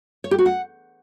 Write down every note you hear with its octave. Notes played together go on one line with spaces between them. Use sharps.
C#5
G4
F#4
F#5